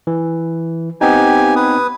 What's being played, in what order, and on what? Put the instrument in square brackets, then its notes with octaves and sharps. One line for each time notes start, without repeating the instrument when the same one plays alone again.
[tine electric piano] E3
[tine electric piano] B3 C4 D#4 [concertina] G4 G#5
[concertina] B4 D#6